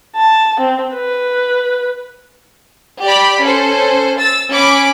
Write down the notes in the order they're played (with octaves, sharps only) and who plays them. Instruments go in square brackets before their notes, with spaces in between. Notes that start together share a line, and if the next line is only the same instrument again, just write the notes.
[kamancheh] A5
C4
B4
[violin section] G4 D5 B5
C#4 A4 C5
E6 A6
C#4 B5 D6